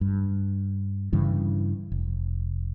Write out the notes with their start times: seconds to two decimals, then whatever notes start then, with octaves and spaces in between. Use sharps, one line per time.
0.01 G2
1.13 G2 C#3 E3
1.92 F1